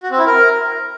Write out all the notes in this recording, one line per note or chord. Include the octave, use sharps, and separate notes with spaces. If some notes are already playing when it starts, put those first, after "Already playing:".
F#4
C4
E4
A#4